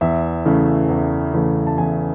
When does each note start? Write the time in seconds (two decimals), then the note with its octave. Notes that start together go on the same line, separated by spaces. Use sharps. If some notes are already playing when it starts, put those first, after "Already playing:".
0.01 E2 E5
0.46 C#3 E3 A3
0.89 E2
1.34 C#3 E3 A3
1.67 A5
1.78 E2 G#5